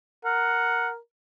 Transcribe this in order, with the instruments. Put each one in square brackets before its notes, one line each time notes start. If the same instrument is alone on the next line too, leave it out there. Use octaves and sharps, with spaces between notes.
[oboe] A#4 [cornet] F#5